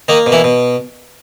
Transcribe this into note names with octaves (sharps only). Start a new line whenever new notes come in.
D#3 A#3 D#4
B2
E3 E4
B2